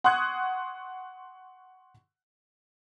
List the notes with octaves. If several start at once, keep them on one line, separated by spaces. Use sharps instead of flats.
F#5 C6 C#6 D#6 F#6 G#6